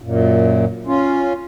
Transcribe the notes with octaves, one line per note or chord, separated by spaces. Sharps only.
F#2 A#2
C#4 F4